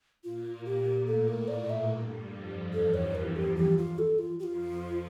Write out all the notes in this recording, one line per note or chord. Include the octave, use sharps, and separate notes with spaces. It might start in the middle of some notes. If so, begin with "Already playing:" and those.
A#2 A#3 F4
G4
A2 A3 A4
A#4
D5
E5
G2 G3
F2 F3
E2 E3 A4
C#5
A#4
G4
G4
F4
A4
F4
F2 F3 F4 G4